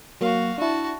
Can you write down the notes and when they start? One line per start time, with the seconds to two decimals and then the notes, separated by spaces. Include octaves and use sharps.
0.21 F#3 A#3 F#4 F5
0.58 D4 E4 F#4 A5